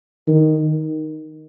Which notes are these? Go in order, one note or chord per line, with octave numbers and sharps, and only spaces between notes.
D#3